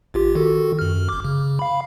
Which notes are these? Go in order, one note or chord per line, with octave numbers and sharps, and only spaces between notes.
A1 F4 G4
D#3 F#4 A4
F#2 F6
G1 D6
C#3
F5 B5